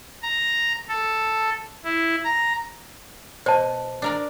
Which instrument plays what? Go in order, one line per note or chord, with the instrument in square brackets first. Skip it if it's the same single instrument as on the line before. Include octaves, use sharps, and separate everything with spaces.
[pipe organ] A#5
A4
E4
A#5
[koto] B2 [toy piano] C5 A5
[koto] D4 A#4 D5